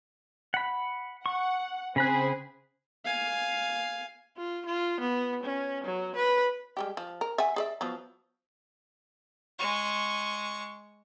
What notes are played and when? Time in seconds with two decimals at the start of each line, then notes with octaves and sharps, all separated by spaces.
0.54 F#5 B5
1.26 F#5 C#6
1.96 C#3 C4 G#4 C5 B5 F#6
3.05 F5 G#5
4.37 F4
4.66 F4
5.00 B3
5.43 C#4
5.84 F#3
6.16 B4
6.77 G3 G#3 G4
6.97 F3
7.21 A#4
7.38 E5 F#5 G#5
7.56 G#4 D5 E5
7.81 F3 F#3 B3
9.59 G#3 C#6